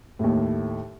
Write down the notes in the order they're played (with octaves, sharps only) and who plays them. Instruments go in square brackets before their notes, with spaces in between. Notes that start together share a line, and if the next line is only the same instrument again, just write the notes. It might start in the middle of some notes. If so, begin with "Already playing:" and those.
[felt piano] D#2 A2